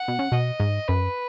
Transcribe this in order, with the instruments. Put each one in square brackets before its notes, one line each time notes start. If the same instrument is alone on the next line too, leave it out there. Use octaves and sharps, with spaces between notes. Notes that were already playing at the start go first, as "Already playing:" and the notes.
Already playing: [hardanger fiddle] F#5
[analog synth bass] B2
C#3
[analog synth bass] B2 [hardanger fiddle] D#5
[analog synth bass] G#2
[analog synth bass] F#2 [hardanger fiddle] B4